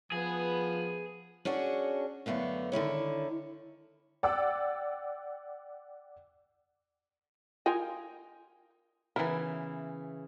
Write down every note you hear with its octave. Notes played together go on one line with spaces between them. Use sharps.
F3 B3 G#4 B4
C#4 D4 F#4 G#4
F#2 D3 A3 B3 F5
D3 D#3 E4 C#5
D5 F#5 G5 D6 E6
F4 A#4 D#5 F5 G5 G#5
C#3 E3 B3 E4 A#4